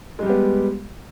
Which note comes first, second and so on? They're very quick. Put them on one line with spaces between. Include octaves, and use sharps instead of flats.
G#3 G3 G4 B3